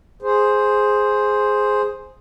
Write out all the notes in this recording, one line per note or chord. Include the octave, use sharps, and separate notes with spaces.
G#4 C5